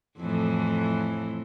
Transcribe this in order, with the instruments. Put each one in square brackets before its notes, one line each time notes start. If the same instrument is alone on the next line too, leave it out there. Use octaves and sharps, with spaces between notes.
[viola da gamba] F2 A2 E3